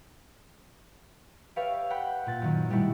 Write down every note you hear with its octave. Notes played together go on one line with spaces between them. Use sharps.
G4 B4 C#5 D5 E5 F5
F#5 G5 B5 F#6
A#2 A6
F#2 D#3
B2 G3 A3 E4 F#4